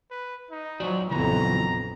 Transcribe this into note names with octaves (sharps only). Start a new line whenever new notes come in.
B4
D#4
F3 F#3 F#4 D5
A#1 F2 C#3 E3 F#3 B3 A#5